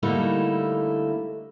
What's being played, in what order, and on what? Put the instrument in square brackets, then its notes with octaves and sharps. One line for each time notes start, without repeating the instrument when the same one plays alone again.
[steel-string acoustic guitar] D3 G3 A3 A#3 D#4 E4